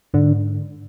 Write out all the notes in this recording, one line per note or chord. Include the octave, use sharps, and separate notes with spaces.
G#2 D3